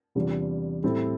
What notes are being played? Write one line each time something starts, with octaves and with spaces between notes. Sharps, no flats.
E2 C3 G3 D4 F4
A2 G3 C4 E4 A4